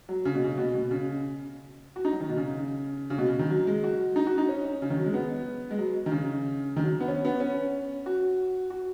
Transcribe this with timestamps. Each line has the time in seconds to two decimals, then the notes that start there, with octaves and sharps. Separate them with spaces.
0.09 F#3
0.25 C#3
0.35 B2
0.44 C#3
0.58 B2
0.75 B2
0.91 C#3
1.96 F#4
2.05 D#4
2.13 F#3
2.21 D#3
2.29 B2
2.37 C#3
3.10 C#3
3.18 B2
3.28 C#3
3.39 D#3
3.50 F#3
3.67 G#3
3.84 F#4
4.16 D#4
4.27 F#4
4.38 D#4
4.49 C#4
4.82 C#3
4.90 D#3
4.97 F#3
5.05 G#3
5.14 B3
5.71 G#3
5.78 F#3
6.06 D#3
6.11 C#3
6.76 D#3
6.84 F#3
7.00 B3
7.08 C#4
7.25 B3
7.40 C#4
8.06 F#4
8.70 F#4